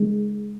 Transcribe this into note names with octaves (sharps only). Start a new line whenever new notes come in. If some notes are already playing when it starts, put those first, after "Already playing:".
Already playing: G#3